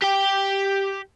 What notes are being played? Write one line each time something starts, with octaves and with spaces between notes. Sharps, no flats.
G4 G5